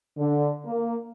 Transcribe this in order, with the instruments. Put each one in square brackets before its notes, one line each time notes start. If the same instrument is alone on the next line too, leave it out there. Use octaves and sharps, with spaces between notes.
[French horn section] D3
A#3